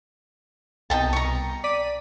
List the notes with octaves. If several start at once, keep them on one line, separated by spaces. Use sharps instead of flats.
C2 B2 D#4 G5 A5 D#6
A#5 C#6
D5 B6 D#7